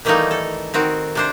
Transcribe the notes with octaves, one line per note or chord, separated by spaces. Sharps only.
D#3 E3 G3 A3 A#3 D#4
A4
D#3 C4 F#4
C3 D4 C5